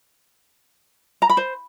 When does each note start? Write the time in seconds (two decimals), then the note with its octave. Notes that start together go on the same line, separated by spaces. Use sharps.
1.22 A#5
1.29 B5
1.37 C5